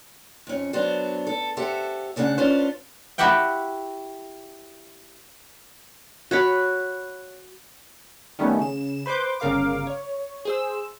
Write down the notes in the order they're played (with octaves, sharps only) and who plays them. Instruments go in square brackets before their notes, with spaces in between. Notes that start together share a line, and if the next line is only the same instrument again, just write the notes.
[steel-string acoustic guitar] F2 C#4
F#3 B3 D4 C5
A4
G4 A4 C5 E5 F#5
D2 C#3 D4 A#4 F#5
C#4 D4 F4 B4 C5
[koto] E4 F#4 G4 E5 F#5 G5
[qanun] F#4 C#5 B5
[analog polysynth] D#3 G3 A3 B3 C#4
C#3 E7
B4 C5 C6 D6 G6
G1 C#3 A#4 F5 D6
C#5
G#4 C5 E6